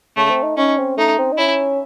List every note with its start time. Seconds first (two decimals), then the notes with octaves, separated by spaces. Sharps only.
0.17 C#3 A3
0.30 C4
0.43 D#4
0.57 C#4 D#4
0.77 C4
0.97 A3 D#4
1.18 C4
1.32 D#4
1.38 C#4 E4